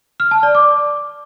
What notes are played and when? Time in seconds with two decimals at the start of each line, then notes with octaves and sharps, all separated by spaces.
0.20 F6
0.31 A5
0.43 D5
0.55 D6